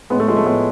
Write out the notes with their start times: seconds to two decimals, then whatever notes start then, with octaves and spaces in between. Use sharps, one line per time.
0.10 A2 G#3 B3
0.20 A3
0.28 F3 G#3
0.37 A3
0.45 A2 G#3 B3